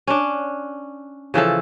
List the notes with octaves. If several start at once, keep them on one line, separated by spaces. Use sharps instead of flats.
C#4 D4
C#3 E3 F3 A4